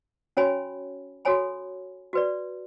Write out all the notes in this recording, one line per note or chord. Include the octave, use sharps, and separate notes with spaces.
C#4 F#4 C#5 G#5 B5
F#4 A4 C#5 G#5 B5
F#4 B4 D5